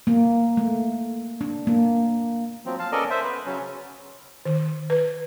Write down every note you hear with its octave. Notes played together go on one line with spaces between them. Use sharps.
A#3
A3
D4
A#3
F3 F#3 C4
F5 A5
B3 C#4 A4 A#4 D5 D#5
C5 E5
B4
C#3 F#3 C#4
D#3
B4